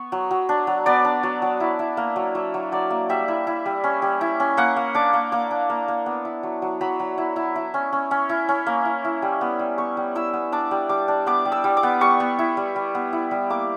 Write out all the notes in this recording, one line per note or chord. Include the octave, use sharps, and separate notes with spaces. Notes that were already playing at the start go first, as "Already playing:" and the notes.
Already playing: B3 C#6
F#3
F#3
D4
F#3
B3 D5
D4
F#3
F#3
E4
E4
A#3
F#3
F#3 E5
F#3
F#3 D5
A#3
G3 E5
E4
E4
G3
C#4
G3
E4
C#4
A#3 F#5
A#3
D4 D6
A#3
A#3 D6
D4
A#3
A#3
B3
E4
F#3
F#3
F#3 B5
F#3
E4
E4
E4
C#4
C#4
C#4
E4
C#4
A#3
E4
E4
G3
B3
G3
B3 C#6
G3
E4 E6
B3
D4 D6
G3
G3 D6
D4
B3 D6
G3
E6
G3
D6
B3
G3 C#6
B3
E4
G3
G3
B3
E4
G3
A#3 D6